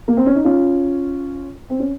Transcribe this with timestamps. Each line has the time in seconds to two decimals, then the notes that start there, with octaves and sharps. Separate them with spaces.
0.08 A#3
0.17 C4
0.26 C#4
0.35 D#4
0.44 C#4 F4
1.70 C4
1.79 C#4